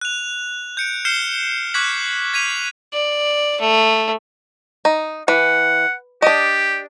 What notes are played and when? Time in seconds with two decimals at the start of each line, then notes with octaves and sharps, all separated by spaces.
0.01 F#6 F7
0.77 G6 C#7 D7
1.05 F6 G6 C7 C#7 E7 G7
1.74 C#6 D6 F#6 G#6 B6 F#7
2.34 G#6 B6 D#7 F7
2.93 D5
3.61 A3
4.85 D#4
5.28 E3 F#5
6.22 D4 G4 D#5